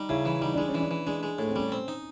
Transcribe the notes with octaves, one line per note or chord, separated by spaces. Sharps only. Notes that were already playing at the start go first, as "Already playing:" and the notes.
Already playing: G3 D#4
C#3 E4
E3 E4
G3 D#4
G#3 D4
C#4
E3
D4
E3
G#3 D4
G#3
A2
C4
G3 C#4
C4
D#4